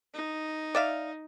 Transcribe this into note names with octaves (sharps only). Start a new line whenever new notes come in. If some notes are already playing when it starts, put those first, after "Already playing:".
D#4
D5 E5 F5